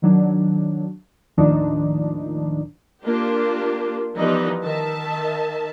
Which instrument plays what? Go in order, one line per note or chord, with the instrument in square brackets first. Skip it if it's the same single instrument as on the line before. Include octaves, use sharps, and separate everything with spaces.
[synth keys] D#3 F#3 D4
D#2 A2 D#3 F3 D4 D#4
[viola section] A#3 D4 F4 G4
E3 F3 G3 B3 D#4 B4
D#3 E5 A5